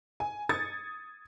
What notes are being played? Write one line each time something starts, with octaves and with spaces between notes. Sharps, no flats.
G#5
D#6 G#6 A6 C#7